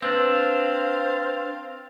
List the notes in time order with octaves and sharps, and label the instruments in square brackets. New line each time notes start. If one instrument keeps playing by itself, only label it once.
[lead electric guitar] C4 D4 [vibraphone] B4 E6 [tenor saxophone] C5 [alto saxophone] F5